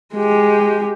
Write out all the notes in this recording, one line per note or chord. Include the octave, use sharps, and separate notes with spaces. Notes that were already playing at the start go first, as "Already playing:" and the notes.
G#3 G4